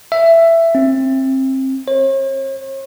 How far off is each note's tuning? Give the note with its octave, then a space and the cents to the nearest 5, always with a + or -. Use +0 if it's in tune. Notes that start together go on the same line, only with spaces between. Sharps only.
E5 +10
C4 +25
C#5 -45